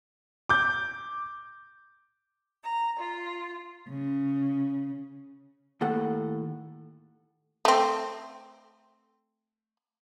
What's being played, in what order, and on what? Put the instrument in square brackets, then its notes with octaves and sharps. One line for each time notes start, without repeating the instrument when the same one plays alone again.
[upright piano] D6 G6
[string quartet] A#5
F4
[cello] C#3
[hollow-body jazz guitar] D#2 A2 A4 F#5
[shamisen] A3 C4